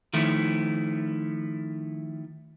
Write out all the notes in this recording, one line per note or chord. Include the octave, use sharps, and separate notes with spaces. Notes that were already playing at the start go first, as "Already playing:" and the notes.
D#3 F3 A3 E4